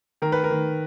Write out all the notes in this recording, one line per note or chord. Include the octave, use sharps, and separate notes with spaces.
D#3 A#4
B4
A#4
D#3